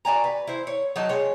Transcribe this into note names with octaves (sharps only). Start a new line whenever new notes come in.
F#4 D5 G#5 A#5
B4
E4 C5
C#5
F#3 D#4 A5
G#3 C#5